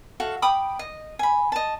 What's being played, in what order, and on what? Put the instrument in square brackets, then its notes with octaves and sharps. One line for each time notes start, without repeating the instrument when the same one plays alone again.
[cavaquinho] F#4 A4 E5 F5
G5 B5 D6 D#6
D#5
G#5 B5
D#5 A5